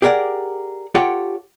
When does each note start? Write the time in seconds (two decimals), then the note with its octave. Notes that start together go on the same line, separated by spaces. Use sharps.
0.02 G4 G#4 A#4 D5 F#5
0.95 F4 G4 A4 C#5 F#5 G5